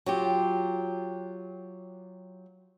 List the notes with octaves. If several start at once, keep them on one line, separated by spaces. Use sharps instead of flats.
F#3 F4 G4